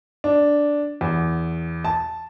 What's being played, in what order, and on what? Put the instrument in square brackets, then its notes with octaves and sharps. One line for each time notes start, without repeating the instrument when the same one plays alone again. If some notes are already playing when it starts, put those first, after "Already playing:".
[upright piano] D4
E2
A5